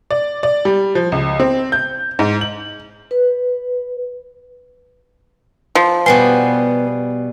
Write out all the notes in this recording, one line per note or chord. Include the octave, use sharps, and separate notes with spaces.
D5
D5
G3
F3
C#2
C4
G6
G#2
F#7
B4
F3
B2 G3 B3 B4 G#5 C6 C7